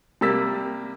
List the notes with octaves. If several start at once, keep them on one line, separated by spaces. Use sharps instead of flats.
C3 G3 A#3 E6 A6 B6